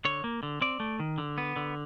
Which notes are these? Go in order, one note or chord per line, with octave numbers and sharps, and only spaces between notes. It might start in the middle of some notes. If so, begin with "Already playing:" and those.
D3 C#5
A#3
D3
C4 D5
A3
D#3
D3
B3
D3